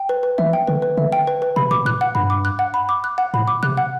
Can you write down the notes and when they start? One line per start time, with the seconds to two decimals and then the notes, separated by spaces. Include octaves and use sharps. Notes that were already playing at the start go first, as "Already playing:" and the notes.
Already playing: G5
0.09 B4
0.23 B4
0.38 E3 E5
0.53 G5
0.67 D3 B4
0.82 B4
0.97 D3 E5
1.12 G5
1.27 B4
1.42 B4
1.56 C3 B5
1.71 B2 D6
1.85 A2 F#6
2.01 F#5
2.15 G2 B5
2.30 D6
2.45 F#6
2.59 F#5
2.74 B5
2.89 D6
3.04 F#6
3.18 F#5
3.34 A2 B5
3.48 D6
3.63 C3 F#6
3.77 F#5